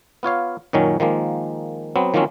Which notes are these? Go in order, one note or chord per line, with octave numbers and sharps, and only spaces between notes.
B3 F4 C#5 F5
F#2 A#2 D#3 F#3 C#4
D#3 F3 G#3 A#3
F#3 B3 C4
D#3 F3 F#3 A#3 C4 C#4